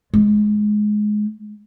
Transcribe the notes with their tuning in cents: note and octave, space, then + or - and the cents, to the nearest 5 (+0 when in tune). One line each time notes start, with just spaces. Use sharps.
G#3 +15